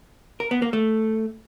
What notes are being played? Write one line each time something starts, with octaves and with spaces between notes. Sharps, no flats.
A#4
B3
A#3
A3